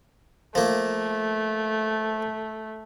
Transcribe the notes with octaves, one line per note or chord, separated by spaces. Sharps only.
F3 A3 A#3